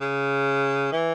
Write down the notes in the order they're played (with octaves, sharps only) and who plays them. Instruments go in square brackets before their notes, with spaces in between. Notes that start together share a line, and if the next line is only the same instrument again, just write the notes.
[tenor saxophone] C#3
E3